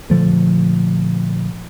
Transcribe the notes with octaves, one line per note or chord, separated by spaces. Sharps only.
A#2 D3 F3 A3